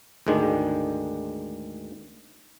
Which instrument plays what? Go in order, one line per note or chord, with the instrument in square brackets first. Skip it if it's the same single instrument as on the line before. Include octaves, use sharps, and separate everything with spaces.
[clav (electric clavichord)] D2 G#2 D#3 G#3 D4